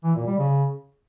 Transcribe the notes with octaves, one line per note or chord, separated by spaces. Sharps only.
E3
A#2
G3
C#3